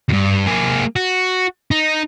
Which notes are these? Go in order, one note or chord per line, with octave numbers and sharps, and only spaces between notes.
E2 G2
A#3 G#4
F#4
D#4